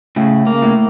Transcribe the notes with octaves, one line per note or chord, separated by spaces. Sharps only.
A2 C#3
A#3
A2